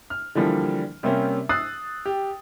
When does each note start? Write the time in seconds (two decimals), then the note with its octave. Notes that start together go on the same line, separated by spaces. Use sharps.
0.10 F6
0.35 D3 E3 F3 G3 A#3
1.03 C3 G3 A#3 C4 C#4
1.49 D#6 E6 F#6 A6 C7
2.06 G4